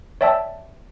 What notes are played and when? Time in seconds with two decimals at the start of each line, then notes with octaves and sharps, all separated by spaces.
0.21 C#5 D5 E5 G5 A5 E6